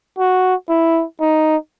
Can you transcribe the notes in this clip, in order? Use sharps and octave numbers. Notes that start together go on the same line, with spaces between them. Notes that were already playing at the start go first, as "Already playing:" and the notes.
F#4
E4
D#4